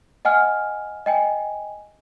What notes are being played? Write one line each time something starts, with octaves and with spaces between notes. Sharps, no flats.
D#5 F#5 G#5 F6
D#5 G5 G#5